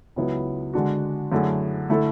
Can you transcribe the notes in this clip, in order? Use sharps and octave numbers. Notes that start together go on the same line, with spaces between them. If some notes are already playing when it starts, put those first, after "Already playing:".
C#2 C#3 F#3 B3 E4
D3 G#3 D4 F#4
F#2 D3 A3 E4 G#4
D3 A3 E4 A4